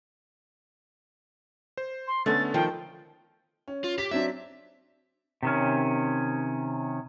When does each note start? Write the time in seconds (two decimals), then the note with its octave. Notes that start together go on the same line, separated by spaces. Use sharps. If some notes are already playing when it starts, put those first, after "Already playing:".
1.77 C5
2.07 C6
2.26 D3 A3 B3 C#4 A6
2.54 D#3 F3 G5
3.68 C#4
3.84 F4
3.98 G4 B6
4.11 F#3 C4 D4 E5
5.43 C3 D#3 C#4